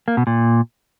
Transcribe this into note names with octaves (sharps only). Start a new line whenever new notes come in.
A#3
B2
A#2